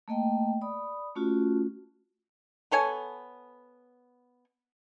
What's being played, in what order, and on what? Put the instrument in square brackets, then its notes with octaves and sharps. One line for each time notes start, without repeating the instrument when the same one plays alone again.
[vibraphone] A3 A#3 D#5 G5
D5 B5 D#6
A3 C#4 F4 F#4
[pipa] B3 A4 C#5 G#5